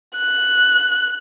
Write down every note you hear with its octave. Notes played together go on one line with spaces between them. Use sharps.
F#6